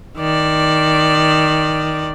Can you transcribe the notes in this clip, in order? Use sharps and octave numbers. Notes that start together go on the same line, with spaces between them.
D#3 D5